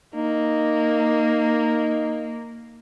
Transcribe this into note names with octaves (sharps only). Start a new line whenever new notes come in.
A#3 D#4